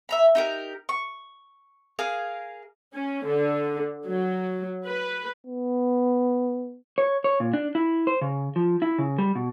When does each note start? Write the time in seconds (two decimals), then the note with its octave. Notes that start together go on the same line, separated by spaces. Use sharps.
0.09 E5 A#5 B5
0.35 D#4 G4 A#4
0.89 C#6
1.99 G#4 A#4 F5 G#5
2.94 C#4
3.26 D3
4.06 F#3
4.86 B4
5.47 B3
6.98 C#5
7.24 C#5
7.40 A#2
7.54 D4
7.75 E4
8.07 C5
8.21 C#3
8.56 F3
8.82 E4
8.98 C#3
9.18 G3
9.35 B2